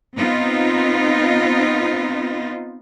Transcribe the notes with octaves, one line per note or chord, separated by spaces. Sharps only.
B3 C4 D#4 F4